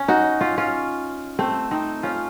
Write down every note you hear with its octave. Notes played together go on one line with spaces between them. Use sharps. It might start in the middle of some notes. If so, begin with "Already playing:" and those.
Already playing: C#4
D#4 F#4
C#4 F4
C#4 F4
A3 C4
C4 D#4
C#4 F4